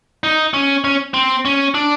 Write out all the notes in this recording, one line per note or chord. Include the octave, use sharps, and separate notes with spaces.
D#4
C#4
C#4
C4
C#4
D4